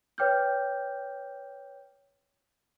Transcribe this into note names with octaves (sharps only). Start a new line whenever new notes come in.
B4 C#5 G5 D6 F6 G6